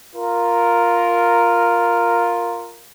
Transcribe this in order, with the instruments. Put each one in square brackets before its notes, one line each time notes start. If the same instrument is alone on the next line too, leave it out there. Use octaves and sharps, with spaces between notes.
[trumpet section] F4 A#4